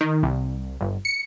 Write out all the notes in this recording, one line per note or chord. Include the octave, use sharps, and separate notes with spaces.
D#3
C2
G1
C#7